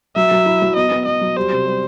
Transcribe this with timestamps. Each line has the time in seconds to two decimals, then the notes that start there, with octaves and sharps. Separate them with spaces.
0.16 F#3 E5
0.31 F#3
0.46 E4
0.62 F#3
0.76 B3 D#5
0.91 B3
1.06 B3 D#5
1.21 F#3
1.36 G3 C5
1.52 C3
1.67 G3